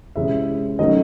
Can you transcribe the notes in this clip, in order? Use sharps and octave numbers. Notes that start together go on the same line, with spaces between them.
C3 E3 G#3 C#4 E4 E5
D#3 F#3 A3 C#4 D#5